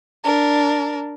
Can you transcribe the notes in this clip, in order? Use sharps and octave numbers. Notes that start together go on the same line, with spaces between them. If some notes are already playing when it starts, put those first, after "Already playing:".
D4 A#4